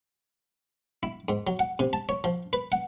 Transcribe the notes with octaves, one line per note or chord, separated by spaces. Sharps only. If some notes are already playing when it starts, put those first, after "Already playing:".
E4
G#2
F#3
F#5
C3
A5
C#5
F3
B4
F#5